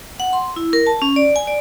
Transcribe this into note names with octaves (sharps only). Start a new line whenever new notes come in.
F#5
C6
E4
A#4
A5
C#4
D5
G#5
D5